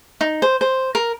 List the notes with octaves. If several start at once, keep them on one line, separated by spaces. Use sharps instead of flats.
D#4
C5
C5
A#4